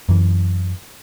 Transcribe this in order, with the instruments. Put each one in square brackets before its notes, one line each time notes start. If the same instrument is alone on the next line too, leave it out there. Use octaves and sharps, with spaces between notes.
[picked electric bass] F#2 E3